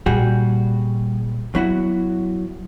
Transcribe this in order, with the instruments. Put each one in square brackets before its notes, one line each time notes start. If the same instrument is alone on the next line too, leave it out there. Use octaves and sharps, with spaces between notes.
[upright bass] A#2 [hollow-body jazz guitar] G3 F#4 G#4
[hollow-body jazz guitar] F#3 E4 F#4 [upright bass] B3